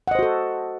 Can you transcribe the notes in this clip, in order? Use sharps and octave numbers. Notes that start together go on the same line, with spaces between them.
F#4 A4 C5 D#5 F#5